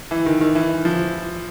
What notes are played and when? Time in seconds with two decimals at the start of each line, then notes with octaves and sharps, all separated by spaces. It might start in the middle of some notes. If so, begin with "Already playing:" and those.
0.11 E3
0.26 D#3
0.41 D#3
0.55 E3
0.85 F3